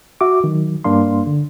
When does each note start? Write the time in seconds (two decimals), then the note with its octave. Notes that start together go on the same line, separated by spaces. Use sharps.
0.21 F#4 E5 D6
0.44 D#3 F#3
0.84 G2 A#3 D4 F5 C6
1.27 D3